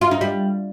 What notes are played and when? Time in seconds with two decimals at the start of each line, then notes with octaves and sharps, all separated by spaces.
0.01 F4
0.11 D#4
0.21 G3